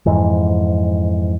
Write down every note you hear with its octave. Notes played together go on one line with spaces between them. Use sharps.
F2 G#2 E3